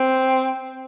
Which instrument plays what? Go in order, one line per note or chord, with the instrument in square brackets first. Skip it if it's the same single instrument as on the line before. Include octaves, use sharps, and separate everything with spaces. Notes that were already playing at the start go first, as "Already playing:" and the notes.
Already playing: [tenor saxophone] C4